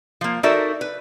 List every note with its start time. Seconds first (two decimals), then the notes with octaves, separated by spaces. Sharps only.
0.21 F3 A#3
0.43 D#4 F#4 A4 A#4 D5 E5
0.81 B4